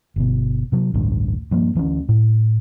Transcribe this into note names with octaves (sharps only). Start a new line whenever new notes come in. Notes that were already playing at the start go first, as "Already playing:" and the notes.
G1 B2
C3 F#3
A1 D2 G2
G2 F3 A#3
D2 E3 B3 C#4
A2